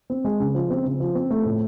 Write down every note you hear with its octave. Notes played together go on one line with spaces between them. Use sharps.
C4
G#3
C#3
F3
C4
C#3
F3
C4
A3
A2